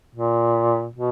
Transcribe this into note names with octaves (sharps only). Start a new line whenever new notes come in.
A#2
B2